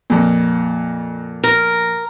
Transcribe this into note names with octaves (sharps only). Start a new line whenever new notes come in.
F2 A#2
A#4